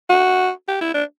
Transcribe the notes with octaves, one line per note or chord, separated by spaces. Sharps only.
F#4
G4
E4
D4